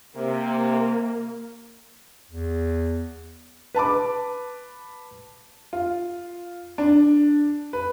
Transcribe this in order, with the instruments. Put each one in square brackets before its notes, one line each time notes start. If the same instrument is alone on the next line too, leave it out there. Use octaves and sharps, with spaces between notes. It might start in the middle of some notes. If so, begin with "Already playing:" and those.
[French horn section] C3 [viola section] A#3
[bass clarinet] E2
[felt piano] B4 A5 B5 D6
[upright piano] F4
D4
B4